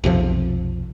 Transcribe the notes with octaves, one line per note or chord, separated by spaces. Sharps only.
B1 F2 C3 F3